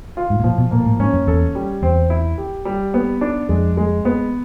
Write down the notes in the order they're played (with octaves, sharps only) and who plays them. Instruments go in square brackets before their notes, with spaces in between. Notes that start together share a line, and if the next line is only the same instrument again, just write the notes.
[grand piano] F4
[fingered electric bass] G#2
A2
[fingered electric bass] A#2 [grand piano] F3
[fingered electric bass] B2
[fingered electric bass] A#2 [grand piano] A#3
[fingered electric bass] A2
[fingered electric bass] G#2 [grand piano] C#4
[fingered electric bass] F#2
[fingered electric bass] E2 [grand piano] A4
[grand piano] G3
[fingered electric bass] E2 [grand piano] C4
[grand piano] E4
G4
G3
B3
D4
[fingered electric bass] F2 [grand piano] G#3
[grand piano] G#3
B3